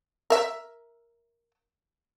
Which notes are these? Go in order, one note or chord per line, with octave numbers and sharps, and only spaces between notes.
A#4 E5